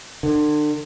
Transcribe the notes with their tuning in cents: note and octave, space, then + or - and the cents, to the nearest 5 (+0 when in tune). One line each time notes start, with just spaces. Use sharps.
D3 +35